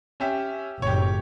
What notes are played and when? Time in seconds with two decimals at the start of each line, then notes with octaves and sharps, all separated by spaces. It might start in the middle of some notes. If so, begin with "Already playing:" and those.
0.20 C#4 G4 E5
0.82 F#1 A2 G4 C#5